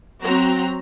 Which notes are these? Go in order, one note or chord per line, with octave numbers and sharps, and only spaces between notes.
F#3 C4 F#4 A#5